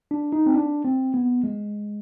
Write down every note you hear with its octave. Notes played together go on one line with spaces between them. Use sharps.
D4
D#4
C4
D4
C4
B3
G#3